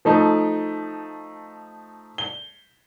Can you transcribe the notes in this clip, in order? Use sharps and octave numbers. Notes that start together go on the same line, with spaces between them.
F3 A3 D#4
G7